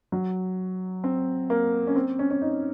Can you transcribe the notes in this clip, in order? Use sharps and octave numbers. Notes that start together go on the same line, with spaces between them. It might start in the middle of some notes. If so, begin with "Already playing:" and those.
F#3
C4
A#3
C#4
C4
C#4
C#4
D#4